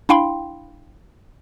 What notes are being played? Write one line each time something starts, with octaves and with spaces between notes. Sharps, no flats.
D4 E4 F5 G5 B5 C6